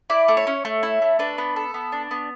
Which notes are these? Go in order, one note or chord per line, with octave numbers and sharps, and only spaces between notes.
E4 D5
A3
C#5
C#4
A3
E4
A3
D4 B4
B3
A4
B3
D4
B3